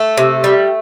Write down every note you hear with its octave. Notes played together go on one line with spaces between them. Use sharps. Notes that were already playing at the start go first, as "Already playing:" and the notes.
Already playing: A3 A4
C3
G3